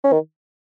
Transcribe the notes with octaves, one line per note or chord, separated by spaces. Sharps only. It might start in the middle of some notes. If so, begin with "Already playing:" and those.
C#4
D#3